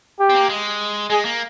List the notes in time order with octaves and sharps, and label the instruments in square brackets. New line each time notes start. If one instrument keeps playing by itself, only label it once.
[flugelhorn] G4
[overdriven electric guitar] C4
A#3
G#3
[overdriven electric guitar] G#3 [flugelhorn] G#4
[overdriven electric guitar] A#3